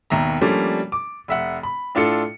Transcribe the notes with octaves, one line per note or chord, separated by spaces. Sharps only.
G#1 D#2 B2 E5 A#5
F3 G3 A3 A#3 C#4 D4
D6
F1 E5 F#5
B5
A2 D4 F4 A4 C#7